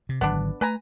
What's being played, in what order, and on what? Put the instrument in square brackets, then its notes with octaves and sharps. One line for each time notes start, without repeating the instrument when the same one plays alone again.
[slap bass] C3
[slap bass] G#1 D3 F#3 [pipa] B3 D4
[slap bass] A3 [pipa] B4 G#5 A#5